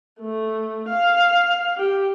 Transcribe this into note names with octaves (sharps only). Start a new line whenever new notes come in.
A3
F5
G4